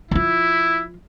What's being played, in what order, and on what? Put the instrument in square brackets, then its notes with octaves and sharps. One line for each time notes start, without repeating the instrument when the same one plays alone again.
[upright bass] F3 F4 [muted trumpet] E4